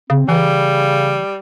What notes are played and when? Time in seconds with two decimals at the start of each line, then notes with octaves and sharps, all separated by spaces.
0.10 C#3 C4
0.29 C#3 E3 G3